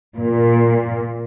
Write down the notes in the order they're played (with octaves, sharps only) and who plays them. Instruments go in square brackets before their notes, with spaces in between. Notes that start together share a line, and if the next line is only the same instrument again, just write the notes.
[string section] A#2